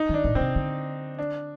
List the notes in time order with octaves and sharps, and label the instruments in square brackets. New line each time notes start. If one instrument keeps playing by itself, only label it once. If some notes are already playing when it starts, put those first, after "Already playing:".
Already playing: [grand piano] D#4
[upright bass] D#3 [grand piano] D4
[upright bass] A#2
[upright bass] A#2 [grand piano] C4
[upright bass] C3
D3
[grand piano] D4